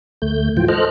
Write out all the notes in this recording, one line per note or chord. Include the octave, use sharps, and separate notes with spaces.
D2 A3 G6
G#2 E3 F3 F4 G5
A4 C5 D#5 F6 F#6